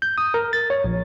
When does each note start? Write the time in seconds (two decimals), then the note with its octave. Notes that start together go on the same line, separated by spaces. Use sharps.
0.02 G6
0.18 D#6
0.34 A#4
0.53 A6
0.70 C#5
0.84 A#1